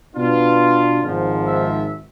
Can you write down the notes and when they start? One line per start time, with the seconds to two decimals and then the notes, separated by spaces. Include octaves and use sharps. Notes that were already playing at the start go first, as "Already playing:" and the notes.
0.16 B2 B3 D4 F4
1.02 G#1 G#2 F3
1.47 E5